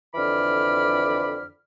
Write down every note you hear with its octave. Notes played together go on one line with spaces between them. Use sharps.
F2 D3 E3 B5 D6 F6